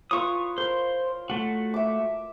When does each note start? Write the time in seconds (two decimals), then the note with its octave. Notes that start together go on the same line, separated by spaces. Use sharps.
0.11 F4 B4 C#5 C#6 D#6
0.58 A#4 C5
1.30 A3 F#4
1.74 E5 D6